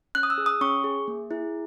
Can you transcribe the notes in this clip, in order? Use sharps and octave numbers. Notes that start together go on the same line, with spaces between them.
C#4 F#6
D#6
E6
G#4
D#6
C#4 C#6
G#4
A#3
E4 G#4